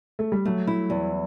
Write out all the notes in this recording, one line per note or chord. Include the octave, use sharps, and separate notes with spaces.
A3
G3
F#3 A3
E4
E2